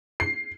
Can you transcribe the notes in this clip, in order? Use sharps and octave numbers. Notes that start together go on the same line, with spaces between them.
C7